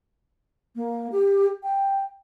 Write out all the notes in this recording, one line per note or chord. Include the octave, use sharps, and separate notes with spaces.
A#3
G4
G5